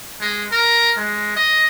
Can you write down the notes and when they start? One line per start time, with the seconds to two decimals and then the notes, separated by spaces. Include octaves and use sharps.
0.21 G#3
0.52 A#4
0.97 G#3
1.36 D#5